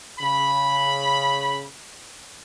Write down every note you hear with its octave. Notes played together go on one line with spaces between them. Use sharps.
C#3 B5